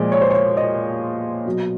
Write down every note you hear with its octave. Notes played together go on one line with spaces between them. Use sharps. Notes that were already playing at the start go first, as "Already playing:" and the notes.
Already playing: A#2 F3 G#3 D5
C#5
C5
C#5
D#5
B2 F#3